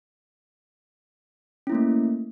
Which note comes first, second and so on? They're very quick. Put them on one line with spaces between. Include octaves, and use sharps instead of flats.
C#4 E4 A#3 A3